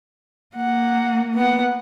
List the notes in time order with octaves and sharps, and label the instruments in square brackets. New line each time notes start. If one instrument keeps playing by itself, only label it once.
[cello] A#3 [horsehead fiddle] F#5
[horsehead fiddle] B3 F#5